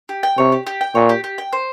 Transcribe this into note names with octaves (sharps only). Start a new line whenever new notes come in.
G4
G5
C3 C#5
G4
G4
G5
A#2 C#5
G4
G4
G5
C5